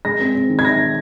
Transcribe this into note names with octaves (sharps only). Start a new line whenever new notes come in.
G#3 A#6
C4
C4
D#3
G#6
D#3 A#6